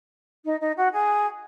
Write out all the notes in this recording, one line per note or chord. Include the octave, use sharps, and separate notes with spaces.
D#4
D#4
F#4
G#4